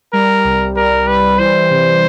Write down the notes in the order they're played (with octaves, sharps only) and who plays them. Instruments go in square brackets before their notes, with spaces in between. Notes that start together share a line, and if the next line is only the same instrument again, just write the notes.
[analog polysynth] G3 [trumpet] A#4
[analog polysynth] C2
[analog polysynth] G3 [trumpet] A#4
[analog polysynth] G3 [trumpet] B4
[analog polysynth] E3 [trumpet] C5
[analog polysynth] C3